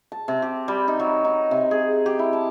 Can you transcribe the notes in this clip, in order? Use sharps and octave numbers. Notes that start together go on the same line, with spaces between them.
A5
C3
G4
G3
D#4
F#3
D#4
C3
G#4
G4
E4
A5